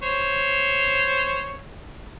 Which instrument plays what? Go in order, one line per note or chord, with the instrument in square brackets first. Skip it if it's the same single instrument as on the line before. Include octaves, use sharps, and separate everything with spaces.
[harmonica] C5 C#5